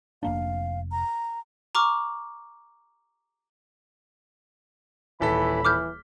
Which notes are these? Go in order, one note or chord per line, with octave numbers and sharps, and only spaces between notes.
F1 A#3 D4 F5
A#5
A#5 C#6 D6 F6
D#1 E3 A4 B5 B6
E3 D6 F6 G6